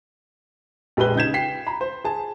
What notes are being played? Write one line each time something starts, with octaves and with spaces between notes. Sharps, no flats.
A#1 G#3 G4 B4 G7
C#3 D#4 G6 G#6 E7
G5 B6 C7
A#5 B5
C5
G#4 A5